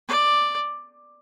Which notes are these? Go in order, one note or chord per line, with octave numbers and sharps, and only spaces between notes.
D5